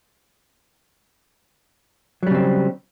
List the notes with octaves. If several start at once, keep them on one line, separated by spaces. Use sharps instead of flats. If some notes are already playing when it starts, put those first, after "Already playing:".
C#3 F#3 G3 C4